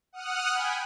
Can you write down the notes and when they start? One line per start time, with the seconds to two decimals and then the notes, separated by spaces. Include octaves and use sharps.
0.13 F#5 D#6 F6 F#6
0.52 G5 G#5 B5